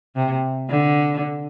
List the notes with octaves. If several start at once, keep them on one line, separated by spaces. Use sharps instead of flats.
C3
D3